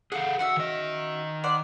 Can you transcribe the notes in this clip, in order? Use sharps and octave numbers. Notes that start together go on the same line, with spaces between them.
G#4 A4 F5 F#5
C#4 F#4 E5 F#5
D#3 D#5
C5 D5 F#5